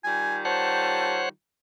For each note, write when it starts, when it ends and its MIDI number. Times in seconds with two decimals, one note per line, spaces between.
0.04 1.28 51
0.04 1.28 55
0.04 1.28 65
0.04 0.37 80
0.45 1.29 72
0.45 1.29 73
0.45 1.29 78
0.45 1.20 81